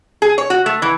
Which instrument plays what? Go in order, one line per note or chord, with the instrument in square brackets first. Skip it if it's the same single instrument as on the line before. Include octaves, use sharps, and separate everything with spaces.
[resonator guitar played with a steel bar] G#4
C#5
F#4
A3
E3